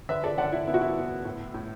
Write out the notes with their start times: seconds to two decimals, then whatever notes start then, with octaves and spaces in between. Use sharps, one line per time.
0.09 D3 B4 E5
0.24 A4 D5
0.37 D3 D5 F#5
0.52 E4
0.67 B3 E4
0.74 F#4
0.81 E4
0.97 B3
1.25 A2
1.54 A2